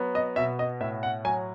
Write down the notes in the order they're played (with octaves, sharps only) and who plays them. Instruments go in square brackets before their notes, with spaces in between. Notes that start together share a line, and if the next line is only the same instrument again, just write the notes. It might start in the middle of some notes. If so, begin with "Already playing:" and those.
Already playing: [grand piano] F#3 B3
D#5
B2 E5
D#5
A2 E5
F#5
F#3 G#5